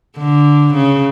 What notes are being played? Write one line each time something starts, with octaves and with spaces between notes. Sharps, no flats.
D3
C#3